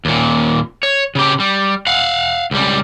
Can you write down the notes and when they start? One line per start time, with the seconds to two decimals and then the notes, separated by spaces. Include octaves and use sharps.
0.05 D#2 A#2
0.83 C#5
1.15 C#3 G4
1.40 G3
1.87 F5 F#5
2.51 C#2 G3